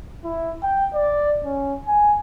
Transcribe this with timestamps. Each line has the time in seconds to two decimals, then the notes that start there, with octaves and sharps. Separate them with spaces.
0.24 E4
0.63 G5
0.94 D5
1.45 C#4
1.87 G#5